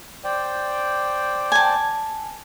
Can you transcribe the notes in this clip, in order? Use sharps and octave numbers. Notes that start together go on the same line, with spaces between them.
C5 D5 G5
G#5 A5